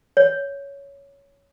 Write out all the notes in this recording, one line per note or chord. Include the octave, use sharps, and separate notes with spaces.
C#5